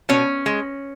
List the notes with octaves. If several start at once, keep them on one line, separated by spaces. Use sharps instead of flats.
B2 C#4
G#3